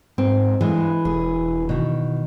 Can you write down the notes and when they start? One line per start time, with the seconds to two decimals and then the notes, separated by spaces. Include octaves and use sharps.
0.18 G#2 C4
0.61 G2 E3 G#3
1.05 E1 G#4
1.69 B2 D#3